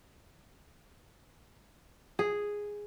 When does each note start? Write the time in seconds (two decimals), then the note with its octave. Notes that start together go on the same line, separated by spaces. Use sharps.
2.19 G#4